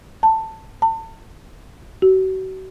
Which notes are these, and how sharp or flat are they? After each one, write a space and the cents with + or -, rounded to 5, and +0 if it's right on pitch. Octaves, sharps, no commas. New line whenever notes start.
A5 +10
A5 +35
F#4 +40